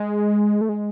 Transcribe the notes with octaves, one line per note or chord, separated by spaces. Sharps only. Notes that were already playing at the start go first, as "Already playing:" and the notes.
Already playing: G#3
A3
G#3